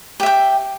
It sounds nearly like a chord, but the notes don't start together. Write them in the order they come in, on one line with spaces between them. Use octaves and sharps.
G4 E5 G5